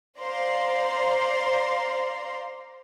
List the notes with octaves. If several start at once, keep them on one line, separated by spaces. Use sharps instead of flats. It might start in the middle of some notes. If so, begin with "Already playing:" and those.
C5 D5 F5 A#5 C6